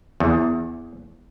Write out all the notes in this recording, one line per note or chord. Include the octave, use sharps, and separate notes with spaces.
E2